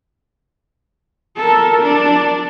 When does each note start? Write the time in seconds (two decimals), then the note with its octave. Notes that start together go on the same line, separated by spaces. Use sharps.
1.37 A4 A#4
1.82 D4